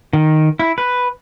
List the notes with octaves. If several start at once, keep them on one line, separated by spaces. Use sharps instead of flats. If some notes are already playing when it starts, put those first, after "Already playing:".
D#3
E4
B4